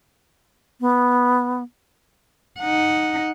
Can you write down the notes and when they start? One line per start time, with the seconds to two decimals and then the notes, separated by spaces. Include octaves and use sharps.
0.80 B3
2.60 D#4 F#5